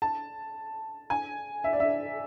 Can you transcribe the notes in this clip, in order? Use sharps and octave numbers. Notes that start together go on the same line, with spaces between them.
A5
G#5
E5
D5
E5